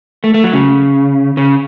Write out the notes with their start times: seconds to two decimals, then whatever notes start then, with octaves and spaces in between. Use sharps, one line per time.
0.24 A3
0.34 A3
0.44 F#3
0.53 C#3
1.37 C#3